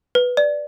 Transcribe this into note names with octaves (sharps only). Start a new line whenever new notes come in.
B4
D5